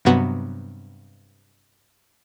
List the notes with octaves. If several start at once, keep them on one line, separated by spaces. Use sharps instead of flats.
G2 C3 F#3 B3 F#4